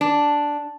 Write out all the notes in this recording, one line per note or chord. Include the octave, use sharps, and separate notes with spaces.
D4